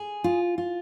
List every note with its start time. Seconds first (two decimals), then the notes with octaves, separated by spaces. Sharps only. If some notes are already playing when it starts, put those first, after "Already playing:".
Already playing: G#4
0.24 F4
0.58 F4